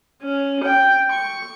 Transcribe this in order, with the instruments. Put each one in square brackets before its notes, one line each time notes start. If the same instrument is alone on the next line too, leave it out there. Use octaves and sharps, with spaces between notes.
[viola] C#4
G5
C#6